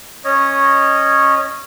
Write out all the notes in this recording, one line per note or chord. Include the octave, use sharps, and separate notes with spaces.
C#4 C#5 D#5